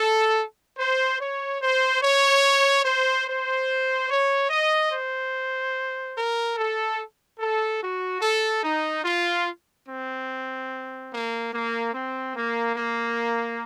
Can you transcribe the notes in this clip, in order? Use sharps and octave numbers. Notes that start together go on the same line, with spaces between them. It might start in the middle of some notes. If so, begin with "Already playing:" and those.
Already playing: A4
C5
C#5
C5
C#5
C5
C5
C#5
D#5
C5
A#4
A4
A4
F#4
A4
D#4
F4
C4
A#3
A#3
C4
A#3
A#3